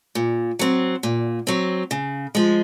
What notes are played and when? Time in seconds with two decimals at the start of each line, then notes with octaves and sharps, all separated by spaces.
0.15 A#2
0.59 F#3 C4
1.03 A#2
1.47 F#3 C4
1.91 C#3
2.35 F3 G#3